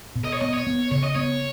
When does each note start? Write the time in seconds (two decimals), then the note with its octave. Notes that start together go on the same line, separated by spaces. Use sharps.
0.16 B2
0.25 D#5
0.33 C#5
0.41 B3 D#5
0.53 C#5
0.67 B3
0.91 C#3 C#5
1.03 D#5
1.15 B3 C#5